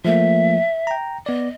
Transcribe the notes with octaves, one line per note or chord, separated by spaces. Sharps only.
F3 A3 A#3 E5
G5 A#5
B3 D5 D#5